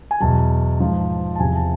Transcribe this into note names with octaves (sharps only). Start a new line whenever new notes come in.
G#5
E2 B2 F#3 A5
G#2 F3
A5
E2 C3 F3 G#5
A5